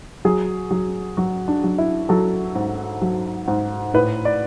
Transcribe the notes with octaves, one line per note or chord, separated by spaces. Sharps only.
F#3 G#4
F#3
F#3 F#4
D4
F#3
E4
F#3 A4
G#2
F#3
G#2
A2 B4
D5